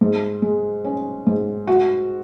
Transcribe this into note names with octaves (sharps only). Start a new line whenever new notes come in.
G#2
G#3
C#4
G#2
F#4